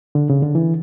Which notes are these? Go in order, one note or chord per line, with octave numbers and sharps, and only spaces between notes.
D3
C#3
D3
E3